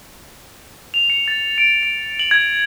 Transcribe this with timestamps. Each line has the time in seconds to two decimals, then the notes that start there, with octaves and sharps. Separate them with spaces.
0.94 F7
1.10 C#7
1.28 A6
1.58 D7
1.83 D7
2.19 F#7
2.31 G#6